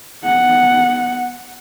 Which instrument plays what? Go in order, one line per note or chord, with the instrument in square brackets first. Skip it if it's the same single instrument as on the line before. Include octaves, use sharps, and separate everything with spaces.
[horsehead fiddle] B3 F#5